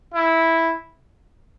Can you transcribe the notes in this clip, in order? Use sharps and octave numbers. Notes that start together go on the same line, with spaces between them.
E4